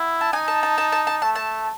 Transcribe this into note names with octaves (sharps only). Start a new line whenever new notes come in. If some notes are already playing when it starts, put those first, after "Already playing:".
Already playing: E4 F#5
A5
D#4 G#5
A5
A5
A5
A5
A5
A3 A5
A5